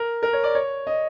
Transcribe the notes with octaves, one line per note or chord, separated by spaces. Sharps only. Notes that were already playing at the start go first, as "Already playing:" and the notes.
Already playing: A#4
A#4
C#5
D5
C#5
D#5